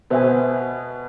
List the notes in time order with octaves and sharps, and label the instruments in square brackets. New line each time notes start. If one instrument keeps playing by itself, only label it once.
[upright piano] B2 B3 [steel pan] C5 E5 G#5